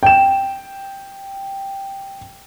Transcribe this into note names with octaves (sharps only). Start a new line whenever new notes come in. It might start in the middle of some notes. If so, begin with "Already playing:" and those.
G5 E7